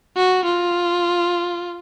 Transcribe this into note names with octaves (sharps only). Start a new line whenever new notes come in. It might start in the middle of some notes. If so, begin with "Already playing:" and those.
F#4
F4